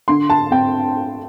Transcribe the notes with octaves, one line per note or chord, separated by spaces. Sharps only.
D3 C6
A5
C4 G5